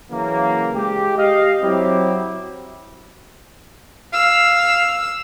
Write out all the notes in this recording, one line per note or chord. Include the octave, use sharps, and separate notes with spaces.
C#3 E3 F#3 A#3
G#3 G4
G4 D#5 F5
F#3 C4 E4 G4
F5 E6